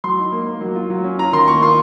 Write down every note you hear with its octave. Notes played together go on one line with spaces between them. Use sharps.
F#3 C6
D#4
A#3
A#3
F#3
F4
F#3
C#4
F4 A#5
D#3 C6
A#3 C#6
F4 C6